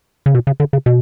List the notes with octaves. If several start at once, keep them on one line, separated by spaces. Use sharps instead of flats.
C#3
B2
C#3
D3
C#3
B2